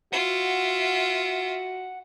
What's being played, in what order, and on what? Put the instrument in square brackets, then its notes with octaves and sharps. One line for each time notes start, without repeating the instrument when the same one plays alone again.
[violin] F4 E5 [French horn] F#4 [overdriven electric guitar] F#5